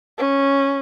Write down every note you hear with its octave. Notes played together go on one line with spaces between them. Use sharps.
C#4